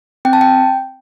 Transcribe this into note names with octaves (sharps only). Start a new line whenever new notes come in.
C4 G5
A5
G5